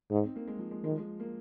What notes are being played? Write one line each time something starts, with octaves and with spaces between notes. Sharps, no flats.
G#2 D#4
C4
A#3
G#3
F3
G#3
D#3 G#3
F3
G#3
A#3